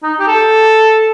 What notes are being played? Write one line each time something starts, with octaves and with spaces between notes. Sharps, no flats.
D#4
G4
A4